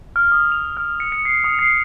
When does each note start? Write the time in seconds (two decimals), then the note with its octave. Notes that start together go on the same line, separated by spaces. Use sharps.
0.16 F6
0.32 D#6
0.52 F7
0.77 F6
1.00 C#7
1.12 C#7
1.25 C7
1.44 D#6
1.59 C7